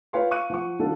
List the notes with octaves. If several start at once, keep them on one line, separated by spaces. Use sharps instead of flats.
F4 B4 C#5 F5 G5 C6
F5 C#6 F#6 D#7
F3 F#5 C#6
D#3 G3 D4 F4 F#4 A4